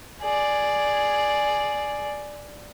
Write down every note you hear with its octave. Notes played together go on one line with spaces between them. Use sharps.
G#4 D5